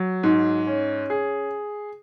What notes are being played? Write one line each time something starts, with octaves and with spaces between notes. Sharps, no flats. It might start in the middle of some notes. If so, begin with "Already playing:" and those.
Already playing: F#3
G#2
C#4
G#4